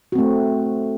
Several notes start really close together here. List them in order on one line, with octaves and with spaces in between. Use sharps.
F#4 C4 A3